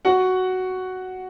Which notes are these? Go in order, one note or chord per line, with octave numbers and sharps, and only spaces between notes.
F#4 F#5